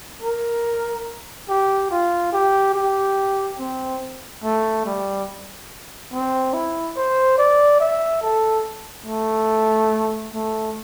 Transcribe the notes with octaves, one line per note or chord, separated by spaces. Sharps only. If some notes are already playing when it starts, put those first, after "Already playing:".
A#4
G4
F4
G4
G4
C4
A3
G3
C4
E4
C5
D5
E5
A4
A3
A3